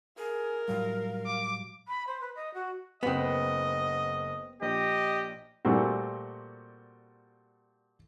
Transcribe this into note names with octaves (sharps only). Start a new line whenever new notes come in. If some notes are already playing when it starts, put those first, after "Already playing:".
G#4 A#4
A2 F#3 G3 F5
D6
B5
C5
B4
D#5
F#4
F#1 B3 C4 D#5 F#5
A#1 G4 D#5
A#2 G3 A3 C4 F#4